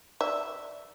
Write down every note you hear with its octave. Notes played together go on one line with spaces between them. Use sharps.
D5 E5